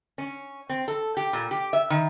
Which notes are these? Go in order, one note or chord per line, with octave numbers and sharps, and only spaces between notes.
C#4
C4
A4
G4
A#2
G4
E5
D#3